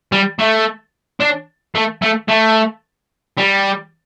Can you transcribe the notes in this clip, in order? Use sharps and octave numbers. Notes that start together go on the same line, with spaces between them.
G3
A3
D4
A3
A3
A3
G3